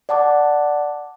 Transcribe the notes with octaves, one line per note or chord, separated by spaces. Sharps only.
D5 F#5 A5 D6